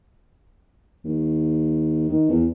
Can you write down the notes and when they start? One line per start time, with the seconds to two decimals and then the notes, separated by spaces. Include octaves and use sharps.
1.05 D#2
2.09 D#3
2.29 E2